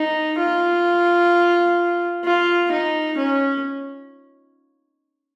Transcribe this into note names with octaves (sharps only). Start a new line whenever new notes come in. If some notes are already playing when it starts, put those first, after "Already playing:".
Already playing: D#4
F4
F4
D#4
C#4